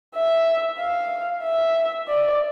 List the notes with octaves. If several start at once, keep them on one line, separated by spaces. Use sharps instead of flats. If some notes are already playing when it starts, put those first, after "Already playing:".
E5
F5
E5
D5